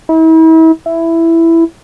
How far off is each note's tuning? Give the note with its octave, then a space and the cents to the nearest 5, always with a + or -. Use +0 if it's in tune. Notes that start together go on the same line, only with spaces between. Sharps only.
E4 -40
E4 +5